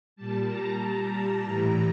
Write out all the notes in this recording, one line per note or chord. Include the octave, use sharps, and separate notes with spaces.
A#2 G3 A5
A#5
A2 E3 G3 A#5